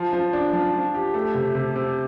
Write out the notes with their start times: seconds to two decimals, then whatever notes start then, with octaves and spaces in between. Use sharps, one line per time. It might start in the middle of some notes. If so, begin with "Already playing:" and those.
Already playing: F3
0.13 F3
0.33 D4
0.53 F3
0.73 F3
0.95 G4
1.14 A3
1.35 C3
1.55 C3
1.76 C3